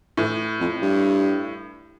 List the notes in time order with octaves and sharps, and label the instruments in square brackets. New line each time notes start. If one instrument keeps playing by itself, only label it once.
[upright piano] A2 [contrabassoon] E3
[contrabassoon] F2
G2